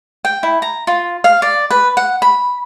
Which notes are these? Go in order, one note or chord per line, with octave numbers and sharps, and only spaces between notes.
G5
E4
A#5
F4
F5
D5
B4
F#5
B5